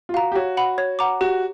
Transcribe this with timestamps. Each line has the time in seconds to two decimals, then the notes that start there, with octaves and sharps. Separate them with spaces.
0.09 F4
0.14 F#4 F5 A#5
0.32 G4
0.35 F#4 C#5
0.57 F#5 B5
0.78 C#5
0.99 F#5 A#5 D6
1.21 F#4 G4